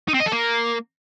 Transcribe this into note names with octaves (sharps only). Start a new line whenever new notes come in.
D#4
C4
D#5
A4
A#3